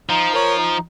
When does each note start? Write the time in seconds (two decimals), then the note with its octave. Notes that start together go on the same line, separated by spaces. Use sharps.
0.09 F3 D#4
0.33 A#4 C#5
0.57 D#4